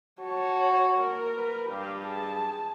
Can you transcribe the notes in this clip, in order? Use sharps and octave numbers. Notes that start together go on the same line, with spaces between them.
F#4 C#5 A5
A#3 A#4
B4
G2 G4 F5
G#4 A5